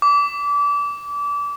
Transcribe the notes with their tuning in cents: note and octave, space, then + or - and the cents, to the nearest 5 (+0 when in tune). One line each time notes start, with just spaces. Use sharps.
D6 -30